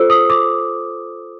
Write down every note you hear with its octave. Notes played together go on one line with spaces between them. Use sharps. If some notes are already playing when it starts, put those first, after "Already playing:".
Already playing: F4 A4 C5 E6
D#6
D6